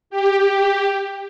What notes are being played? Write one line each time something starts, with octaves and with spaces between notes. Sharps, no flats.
G4